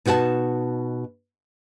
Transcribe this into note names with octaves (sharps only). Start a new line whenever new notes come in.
B2 D#4 F#4 C5 A5